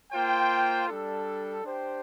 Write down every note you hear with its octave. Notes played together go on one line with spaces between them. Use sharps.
A#3 F4 C5 G5
G3 D4 A4
D4 G4 C5 G5